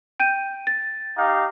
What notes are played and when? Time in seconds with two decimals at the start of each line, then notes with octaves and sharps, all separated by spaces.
0.20 G5 G6 D#7
0.67 A6
1.17 D#4 G4 F5